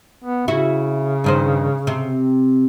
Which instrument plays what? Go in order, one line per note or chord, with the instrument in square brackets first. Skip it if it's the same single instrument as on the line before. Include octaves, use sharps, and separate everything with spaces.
[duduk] B3
[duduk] C#3 [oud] E4 F#4
[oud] G2 D#3 C5
C3